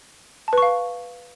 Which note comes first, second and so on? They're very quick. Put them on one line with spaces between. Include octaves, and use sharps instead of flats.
A5 B4 C#6 F5